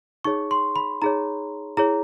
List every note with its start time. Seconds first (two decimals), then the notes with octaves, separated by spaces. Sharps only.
0.24 D#4 G#4 C#5 C#6
0.51 C6
0.76 B5
1.02 D#4 G#4 C#5 A#5
1.77 E4 G#4 C#5 A#5